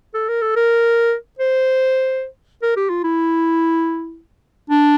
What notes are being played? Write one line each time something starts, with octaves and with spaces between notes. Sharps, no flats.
A4
A#4
A4
A#4
C5
A#4
G4
F4
E4
D4